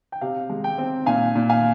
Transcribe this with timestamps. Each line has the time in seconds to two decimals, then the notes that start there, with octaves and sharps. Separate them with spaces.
0.12 G5
0.21 C3 F5
0.50 G#3
0.64 G5
0.78 C4
1.06 A#2 F5 G#5
1.35 A#2
1.49 F5 G#5